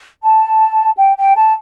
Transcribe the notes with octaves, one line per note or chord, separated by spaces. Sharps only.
A5
G5
G5
A5